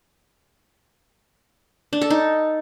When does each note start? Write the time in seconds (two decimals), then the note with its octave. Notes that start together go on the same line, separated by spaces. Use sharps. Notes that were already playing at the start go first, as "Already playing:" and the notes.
1.93 D4
2.01 A4
2.10 D#4